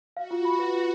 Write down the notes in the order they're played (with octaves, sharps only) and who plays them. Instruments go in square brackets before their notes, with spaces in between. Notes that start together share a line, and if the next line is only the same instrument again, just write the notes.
[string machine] F#4 [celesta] F5
[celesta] F4
B5
B4
F4